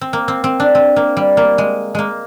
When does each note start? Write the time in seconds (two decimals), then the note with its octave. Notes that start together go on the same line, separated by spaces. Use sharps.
0.01 C4
0.13 A#3
0.28 C4
0.44 C4
0.60 D4
0.75 C4
0.96 A#3
1.17 G3
1.37 A#3
1.58 G#3
1.95 G#3 A#3